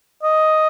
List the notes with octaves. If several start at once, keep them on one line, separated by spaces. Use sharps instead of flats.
D#5